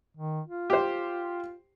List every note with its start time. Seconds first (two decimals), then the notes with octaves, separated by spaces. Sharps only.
0.17 D#3
0.48 F4
0.70 G4 C5